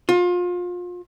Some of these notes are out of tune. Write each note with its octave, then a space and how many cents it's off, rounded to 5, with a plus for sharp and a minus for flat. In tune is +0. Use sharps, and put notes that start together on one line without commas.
F4 +30